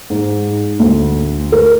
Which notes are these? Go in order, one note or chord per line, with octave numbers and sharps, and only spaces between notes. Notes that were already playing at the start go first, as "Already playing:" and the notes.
G#2
D2
A#4